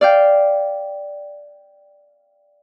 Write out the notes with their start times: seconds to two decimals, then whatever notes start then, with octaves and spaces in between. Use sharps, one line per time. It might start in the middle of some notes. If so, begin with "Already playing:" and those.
0.01 D5 F5 G5